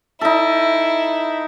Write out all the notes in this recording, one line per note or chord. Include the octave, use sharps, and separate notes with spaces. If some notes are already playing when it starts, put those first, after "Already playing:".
D#4 E4 A4